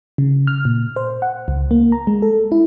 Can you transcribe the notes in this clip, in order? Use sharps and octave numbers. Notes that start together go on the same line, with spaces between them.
C#3
F6
A#2
C5
F#5
C#2
A#3
A#5
G#3
A4
E4